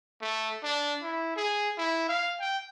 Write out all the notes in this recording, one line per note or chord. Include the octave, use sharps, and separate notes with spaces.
A3
D4
E4
G#4
E4
F5
G5